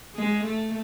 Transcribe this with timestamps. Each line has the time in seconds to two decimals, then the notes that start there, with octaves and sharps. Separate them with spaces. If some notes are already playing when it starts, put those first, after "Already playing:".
0.16 G#3
0.44 A3